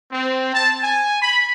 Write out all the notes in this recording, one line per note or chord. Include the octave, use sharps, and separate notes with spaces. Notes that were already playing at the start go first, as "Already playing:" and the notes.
C4
A5
G#5
B5